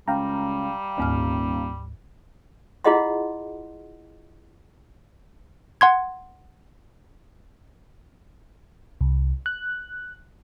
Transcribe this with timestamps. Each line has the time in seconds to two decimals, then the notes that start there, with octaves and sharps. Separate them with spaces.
0.08 C#2 G3 F5 G5 A#5
0.98 D#1 D2 G#2 F6
2.84 E4 F4 G#4 D#5 F#5 C6
5.81 F#5 C6 G#6
9.01 C2
9.46 F#6